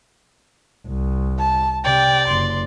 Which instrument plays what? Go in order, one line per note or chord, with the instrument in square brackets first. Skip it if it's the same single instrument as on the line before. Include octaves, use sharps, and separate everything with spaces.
[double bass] C2
[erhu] A5
[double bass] C3 [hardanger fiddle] D5 [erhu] G5
[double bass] F#1 [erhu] C6